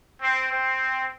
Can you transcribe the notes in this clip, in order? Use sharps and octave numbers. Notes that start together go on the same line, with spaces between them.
C4
C4